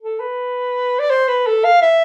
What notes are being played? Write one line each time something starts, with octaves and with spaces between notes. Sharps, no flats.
A4
B4
D5
C5
B4
A4
F5
E5